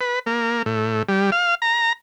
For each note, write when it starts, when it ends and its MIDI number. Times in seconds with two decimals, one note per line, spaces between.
0.01 0.19 71
0.26 0.62 58
0.66 1.02 45
1.08 1.30 55
1.32 1.55 77
1.62 1.93 82